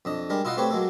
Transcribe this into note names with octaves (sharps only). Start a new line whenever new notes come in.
F2 D4 D#5
G3 G#3 D4 A#4
E4 F4 D#5 F5 F#5
A3 C4 G4 B4 C#5
F#3 G#3 A#3 A4